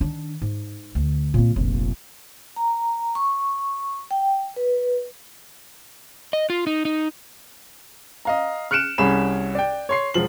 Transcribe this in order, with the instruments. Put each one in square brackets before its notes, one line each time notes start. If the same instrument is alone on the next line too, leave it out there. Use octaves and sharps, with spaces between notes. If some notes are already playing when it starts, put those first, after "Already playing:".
[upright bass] D#3 D4
G#2
D2
A#2 C4
F1 A#1
[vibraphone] A#5
C#6
G5
B4
[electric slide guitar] D#5
F4
D#4
D#4
[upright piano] D#5 F5 A#5
F6 F#6 C#7 D7 E7
C2 C#4 G#4 B5 E7
D5 G5
C#5 C6 C7
E1 F3 F#7